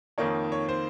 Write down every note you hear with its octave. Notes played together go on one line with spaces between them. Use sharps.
F2 D#3 A#3 D#4 C#5
C#5
C5